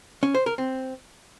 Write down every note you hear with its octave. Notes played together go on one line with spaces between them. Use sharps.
C#4
C5
A#4
C4